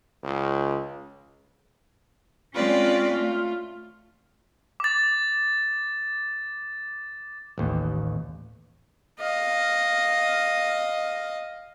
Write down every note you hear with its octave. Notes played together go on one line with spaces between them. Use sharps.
C#2
G#3 C4 C#4 F4 B4 D5
A3 F4
D6 A6
A1 D#2
D#5 F5